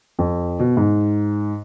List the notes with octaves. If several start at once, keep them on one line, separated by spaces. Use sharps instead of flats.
F2
B2
G#2